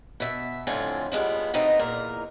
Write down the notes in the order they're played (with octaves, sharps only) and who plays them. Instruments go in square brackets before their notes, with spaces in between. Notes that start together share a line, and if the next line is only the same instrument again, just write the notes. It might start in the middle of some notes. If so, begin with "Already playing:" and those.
[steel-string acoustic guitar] B2 E5
F2 A2 D3 C4 F4 G#5
F3 G3 G#3 B3
B2 A3 B3 C4 D#4 B4
E2 A#2 A#4